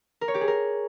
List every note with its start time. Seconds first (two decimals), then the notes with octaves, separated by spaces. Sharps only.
0.21 A#4
0.28 C#5
0.34 G4
0.41 G#4
0.48 A#4